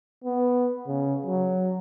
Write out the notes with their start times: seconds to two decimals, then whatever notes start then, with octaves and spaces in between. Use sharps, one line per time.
0.24 B3
0.87 C#3
1.26 F#3